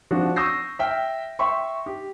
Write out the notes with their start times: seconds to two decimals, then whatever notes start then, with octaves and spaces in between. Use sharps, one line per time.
0.11 F3 C4 D4 F#4
0.36 C#6 D#6 E6 G6 A#6 C7
0.79 E5 G5 F6
1.39 E5 G5 C6 C#6
1.86 G4